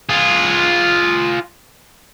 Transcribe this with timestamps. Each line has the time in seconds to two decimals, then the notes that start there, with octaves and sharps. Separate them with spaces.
0.09 F4 G#4